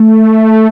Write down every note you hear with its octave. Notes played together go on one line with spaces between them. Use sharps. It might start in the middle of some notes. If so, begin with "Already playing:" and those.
Already playing: A3